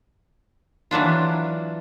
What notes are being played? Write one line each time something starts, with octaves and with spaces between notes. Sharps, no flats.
E3 F#3 D4 F4